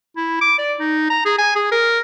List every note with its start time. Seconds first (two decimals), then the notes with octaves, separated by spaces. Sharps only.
0.17 E4
0.41 D6
0.59 D5
0.79 D#4
1.10 A#5
1.26 G#4
1.38 G#5
1.55 G#4
1.72 A#4